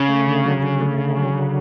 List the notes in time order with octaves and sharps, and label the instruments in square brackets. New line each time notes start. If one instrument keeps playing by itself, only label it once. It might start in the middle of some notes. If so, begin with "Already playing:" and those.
Already playing: [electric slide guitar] C#3
[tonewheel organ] A3
D3
F#3
D3
A3
D3
F#3
D3